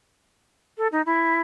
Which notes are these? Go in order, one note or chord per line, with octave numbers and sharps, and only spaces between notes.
A4
D#4
E4